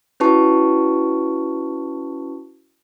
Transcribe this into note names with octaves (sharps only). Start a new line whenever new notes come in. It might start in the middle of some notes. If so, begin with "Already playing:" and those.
C#4 E4 F#4 B4 A5 C#6